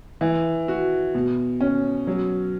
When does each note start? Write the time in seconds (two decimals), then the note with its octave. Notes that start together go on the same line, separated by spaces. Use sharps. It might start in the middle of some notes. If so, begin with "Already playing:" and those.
0.21 E3
0.68 F#4
1.15 B2
1.61 C#4
2.07 F#3